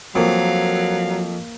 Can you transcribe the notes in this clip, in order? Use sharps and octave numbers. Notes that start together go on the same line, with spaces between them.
F2 F#3 A#3 F5